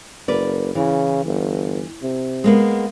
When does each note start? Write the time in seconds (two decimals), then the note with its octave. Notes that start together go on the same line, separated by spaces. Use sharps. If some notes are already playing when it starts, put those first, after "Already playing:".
0.28 F#1 A#4 B4 D5
0.75 C#3 E3
1.25 G1
2.03 C3
2.44 G#3 A#3 B3